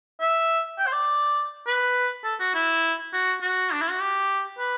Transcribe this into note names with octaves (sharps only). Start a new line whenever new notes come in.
E5
G5
C5
D5
B4
A4
F#4
E4
F#4
F#4
D4
E4
F#4
G4
B4